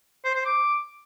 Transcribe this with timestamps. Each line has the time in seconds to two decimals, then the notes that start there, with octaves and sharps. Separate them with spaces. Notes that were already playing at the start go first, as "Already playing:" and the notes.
0.24 C5
0.35 C5
0.45 D6